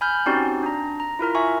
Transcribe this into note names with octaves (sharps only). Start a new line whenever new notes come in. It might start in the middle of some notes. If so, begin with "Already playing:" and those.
G#5 B5 F6 G6
C4 C#4 D#4 F#4 G4 D5
D4 A#5
A#5
E4 F4 A#4 A#5
E5 G#5 C#6